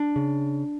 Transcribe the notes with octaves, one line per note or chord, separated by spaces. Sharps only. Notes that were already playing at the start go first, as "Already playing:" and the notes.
Already playing: D4
C#3